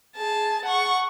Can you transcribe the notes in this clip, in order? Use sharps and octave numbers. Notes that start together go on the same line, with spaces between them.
G#4 A5
F#5 C#6